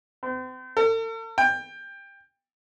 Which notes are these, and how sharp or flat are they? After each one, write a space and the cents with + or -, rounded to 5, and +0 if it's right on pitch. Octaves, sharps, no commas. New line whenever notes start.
C4 -40
A4 +45
G5 +20